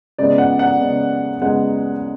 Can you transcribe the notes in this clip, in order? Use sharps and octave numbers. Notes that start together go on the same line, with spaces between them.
C#3 G#3 B3 D5
F#5
F#5
C#3 G#3 B3
C#3 G#3 B3 F#5